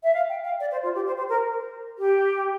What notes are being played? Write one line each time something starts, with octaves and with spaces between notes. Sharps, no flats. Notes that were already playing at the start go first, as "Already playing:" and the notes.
E5
F5
G5
F5
D5
C5
F4
G4
C5
C5
A#4
G4